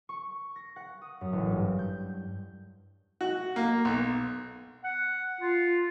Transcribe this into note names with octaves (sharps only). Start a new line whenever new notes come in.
C#6
A#6
F#5
D#6
F#2
A1
G2
G6
F#4
A#3
B1
F#5
F4